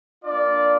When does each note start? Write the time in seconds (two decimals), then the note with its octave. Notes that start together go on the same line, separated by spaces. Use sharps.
0.24 A#3 D4 F4 D5